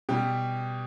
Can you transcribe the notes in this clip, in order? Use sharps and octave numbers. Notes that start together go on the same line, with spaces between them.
B2 G3 G4